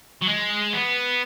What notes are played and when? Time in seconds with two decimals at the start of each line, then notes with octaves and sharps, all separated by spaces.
0.22 F#3
0.27 G#3
0.73 B3